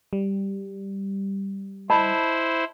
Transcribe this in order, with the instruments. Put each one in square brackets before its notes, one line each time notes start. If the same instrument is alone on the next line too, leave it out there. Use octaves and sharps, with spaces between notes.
[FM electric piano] G3
[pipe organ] E4 C5 [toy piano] D#5 A5 B5